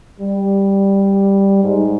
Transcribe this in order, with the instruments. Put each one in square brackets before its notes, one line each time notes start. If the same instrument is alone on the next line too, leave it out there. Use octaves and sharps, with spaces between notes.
[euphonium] G3
G#2